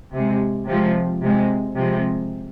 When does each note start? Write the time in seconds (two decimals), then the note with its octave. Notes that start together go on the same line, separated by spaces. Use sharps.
0.13 C3 G#3
0.67 C3 F3 G#3
1.21 C3 G#3
1.76 C3 F3 G#3